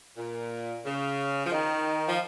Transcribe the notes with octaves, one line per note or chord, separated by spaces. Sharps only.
A#2
C#3
F3
D#3
F3